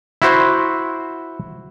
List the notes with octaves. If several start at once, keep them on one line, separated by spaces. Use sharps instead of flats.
E4 F#4 C5